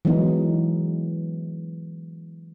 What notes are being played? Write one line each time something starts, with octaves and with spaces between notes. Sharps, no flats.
E3 F#3 G#3 B3 D#4